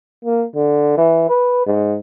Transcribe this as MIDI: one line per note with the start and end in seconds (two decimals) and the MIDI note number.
0.25 0.45 58
0.55 0.96 50
0.97 1.25 52
1.29 1.63 71
1.67 1.97 44